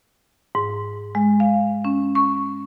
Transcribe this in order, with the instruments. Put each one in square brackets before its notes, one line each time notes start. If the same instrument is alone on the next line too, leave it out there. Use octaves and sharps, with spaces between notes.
[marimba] G#2
G#3
F5
C#4
C#6